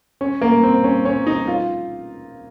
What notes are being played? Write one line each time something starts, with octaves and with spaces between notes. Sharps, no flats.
C#4
A#3
C4
C#4
C#4
D#4
F4